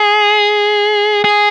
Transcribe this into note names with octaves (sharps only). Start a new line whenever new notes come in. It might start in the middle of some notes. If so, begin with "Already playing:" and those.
Already playing: G#4
G#4